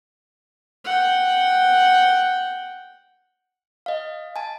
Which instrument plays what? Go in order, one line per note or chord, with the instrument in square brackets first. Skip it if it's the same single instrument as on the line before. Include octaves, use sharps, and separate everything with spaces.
[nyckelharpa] F#5 G5
[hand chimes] D#5 F5
G#5 A5